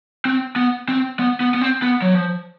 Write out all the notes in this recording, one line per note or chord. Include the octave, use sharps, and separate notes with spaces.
C4
B3
C4
B3
B3
B3
C4
B3
F#3
F3